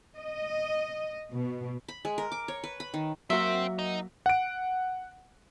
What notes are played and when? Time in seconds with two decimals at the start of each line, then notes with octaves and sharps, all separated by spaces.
0.17 D#5
1.33 B2
1.88 B5
2.05 G#3
2.18 A#4
2.32 D6
2.48 C#5
2.64 B4
2.80 B5
2.94 D#3
3.30 F#3 A#3 C4 F#4 E5
3.79 D#4
4.26 F#5 D7